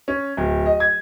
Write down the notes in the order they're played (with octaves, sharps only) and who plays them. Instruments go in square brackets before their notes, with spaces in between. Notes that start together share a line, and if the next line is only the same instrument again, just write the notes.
[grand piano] C#4
D1
D#5
G#6